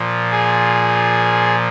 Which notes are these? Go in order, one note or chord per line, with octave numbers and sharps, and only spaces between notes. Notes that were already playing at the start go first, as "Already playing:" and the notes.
Already playing: A#2 F3
G#4